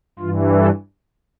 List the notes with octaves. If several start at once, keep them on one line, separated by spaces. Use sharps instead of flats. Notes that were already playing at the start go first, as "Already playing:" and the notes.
G2 E3 F4
A4